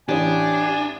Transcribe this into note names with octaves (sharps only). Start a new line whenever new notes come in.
A1 E3 D4 G4 C#5 G#5